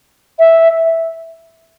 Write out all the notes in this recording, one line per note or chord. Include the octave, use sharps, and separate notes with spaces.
E5